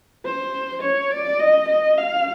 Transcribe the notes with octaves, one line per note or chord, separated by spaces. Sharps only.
C5
C#5
D5
D#5
D#5
F5